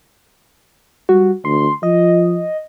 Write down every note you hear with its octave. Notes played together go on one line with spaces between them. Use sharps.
G3 F#4
D2 C6
F3 D#5